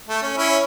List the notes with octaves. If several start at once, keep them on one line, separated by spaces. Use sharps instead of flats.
A3
C#4
C#4 E4